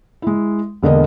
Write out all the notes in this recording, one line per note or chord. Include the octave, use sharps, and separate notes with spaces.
G#3 E4
E1 D3 A#3 A#4 D#5